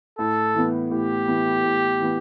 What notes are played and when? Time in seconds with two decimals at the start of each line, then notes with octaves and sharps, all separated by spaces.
0.18 A2 A4
0.55 E3 B3
0.90 A2 G4
1.27 E3 B3
1.64 A2
2.00 E3 B3